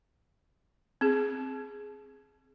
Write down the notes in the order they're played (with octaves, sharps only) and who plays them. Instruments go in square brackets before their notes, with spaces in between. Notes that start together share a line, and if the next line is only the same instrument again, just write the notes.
[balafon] C4 G#4